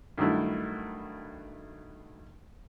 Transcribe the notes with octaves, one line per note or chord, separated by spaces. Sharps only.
G2 D#3 F#3 A3 E4